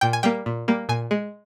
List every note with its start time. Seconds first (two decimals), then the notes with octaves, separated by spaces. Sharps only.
0.01 A#2 G5
0.13 G#5
0.23 G3 A#3 G5
0.46 A#2
0.68 G3 A#3
0.89 A#2 G#5
1.11 G#3